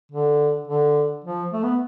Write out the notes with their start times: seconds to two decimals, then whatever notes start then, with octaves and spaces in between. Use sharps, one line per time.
0.12 D3
0.68 D3
1.24 F3
1.53 A3
1.63 B3